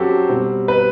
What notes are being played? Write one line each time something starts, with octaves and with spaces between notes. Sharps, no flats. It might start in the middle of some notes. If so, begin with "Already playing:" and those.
Already playing: F#2 F#3 C4 F#4 G4 A4 C5
B2 G3 C4
B4